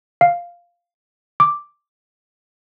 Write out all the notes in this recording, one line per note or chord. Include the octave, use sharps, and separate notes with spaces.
F5
D6